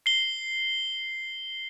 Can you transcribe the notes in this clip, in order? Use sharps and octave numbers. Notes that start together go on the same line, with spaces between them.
C7 G7